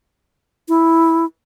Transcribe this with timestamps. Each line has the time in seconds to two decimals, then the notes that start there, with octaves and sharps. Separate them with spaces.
0.69 E4